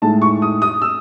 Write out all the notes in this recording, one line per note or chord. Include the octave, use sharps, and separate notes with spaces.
A2 G#3 D#4 A5
C#6
D#6
D#6
E6